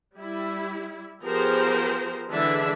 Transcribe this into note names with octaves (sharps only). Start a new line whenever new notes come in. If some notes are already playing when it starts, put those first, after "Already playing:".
G3 E4
F3 B3 G4 G#4 A#4 C5
D3 E3 G#3 D4 E5